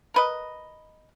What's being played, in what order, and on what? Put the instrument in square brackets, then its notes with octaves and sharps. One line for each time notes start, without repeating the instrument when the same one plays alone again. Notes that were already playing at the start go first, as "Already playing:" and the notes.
[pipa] A#4 B4 D#5